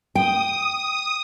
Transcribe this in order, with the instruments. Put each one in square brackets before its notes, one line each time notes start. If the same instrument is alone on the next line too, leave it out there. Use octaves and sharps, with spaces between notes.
[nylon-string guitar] G5 [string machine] D#6